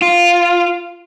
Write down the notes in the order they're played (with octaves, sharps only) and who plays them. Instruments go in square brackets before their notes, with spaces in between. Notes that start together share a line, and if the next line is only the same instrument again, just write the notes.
[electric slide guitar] F4